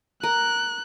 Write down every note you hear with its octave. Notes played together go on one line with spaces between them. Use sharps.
A#4 F#6